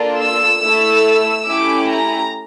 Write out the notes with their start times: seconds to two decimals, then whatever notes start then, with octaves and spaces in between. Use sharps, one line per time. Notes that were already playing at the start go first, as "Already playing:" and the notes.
Already playing: A#3 D4 F4 A4
0.20 E6
0.63 A3 E4 A4
1.46 A3 C#4 E4 G4 D6
1.89 A#5